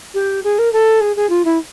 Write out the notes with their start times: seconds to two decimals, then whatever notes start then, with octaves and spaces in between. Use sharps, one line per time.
0.14 G4
0.44 G#4
0.59 A#4
0.73 A4
1.01 G#4
1.16 G#4
1.29 F4
1.45 E4